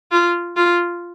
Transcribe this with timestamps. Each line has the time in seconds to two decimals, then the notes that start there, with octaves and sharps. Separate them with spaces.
0.12 F4
0.56 F4